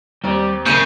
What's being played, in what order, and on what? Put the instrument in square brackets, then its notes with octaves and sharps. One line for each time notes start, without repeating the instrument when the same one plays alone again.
[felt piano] D#2 C4 [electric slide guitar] G3 G4
[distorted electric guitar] C#3 [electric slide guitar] A#3 G#4 A#4 [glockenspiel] G6 D#7